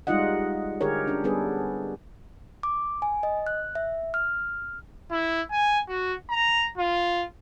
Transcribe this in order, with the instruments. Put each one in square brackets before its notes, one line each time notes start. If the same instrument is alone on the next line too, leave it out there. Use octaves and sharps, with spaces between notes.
[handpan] G3 G#3 D#4 F4 D#5 F#5
D3 G4 G#4 A#4 C#5
C#4 D4
G3 B3 D4 G#4 A4 B4
[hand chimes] D6
G#5
D#5
F#6
E5
F6
[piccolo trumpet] E4
G#5
F#4
A#5
F4